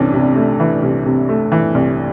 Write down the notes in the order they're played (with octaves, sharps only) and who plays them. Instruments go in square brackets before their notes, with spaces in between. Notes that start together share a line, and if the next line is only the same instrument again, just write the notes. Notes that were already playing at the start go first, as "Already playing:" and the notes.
Already playing: [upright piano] C2 C3 E3 A3 [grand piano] C#4 D4
[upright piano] C3
A3
E3
C2
C3
A3
E3
C2